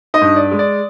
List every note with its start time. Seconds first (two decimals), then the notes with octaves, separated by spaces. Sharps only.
0.14 D#4 D#5
0.21 G2
0.36 D5
0.51 G#3
0.59 D5